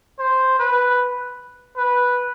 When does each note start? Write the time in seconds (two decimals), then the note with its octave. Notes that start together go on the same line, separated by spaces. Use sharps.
0.19 C5
0.59 B4
1.77 B4